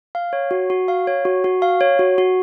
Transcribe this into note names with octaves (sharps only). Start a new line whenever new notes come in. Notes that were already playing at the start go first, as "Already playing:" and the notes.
F5
C#5
F#4
F#4
F5
C#5
F#4
F#4
F5
C#5
F#4
F#4